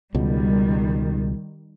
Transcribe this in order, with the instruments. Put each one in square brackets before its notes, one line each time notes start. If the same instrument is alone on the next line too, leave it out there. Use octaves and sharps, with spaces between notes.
[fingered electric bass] C#2 B2 [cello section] D#3 G3